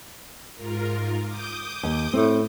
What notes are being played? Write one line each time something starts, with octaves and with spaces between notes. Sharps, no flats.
G#2 F4 A#4
D6 D#6 G6
D#2
A2 C4